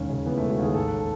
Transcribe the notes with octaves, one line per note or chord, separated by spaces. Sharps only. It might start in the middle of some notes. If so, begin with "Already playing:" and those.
Already playing: E1 D#2 C#4
C#3
E3 B3
A3
E1
F#4
D#2 G#4
A1 A4
A4